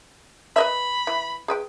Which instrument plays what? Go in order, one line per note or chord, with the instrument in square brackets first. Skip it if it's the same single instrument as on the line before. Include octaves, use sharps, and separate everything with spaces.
[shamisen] B4 D#5 E5 [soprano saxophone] B5
[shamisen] E3
G#4 B4 G5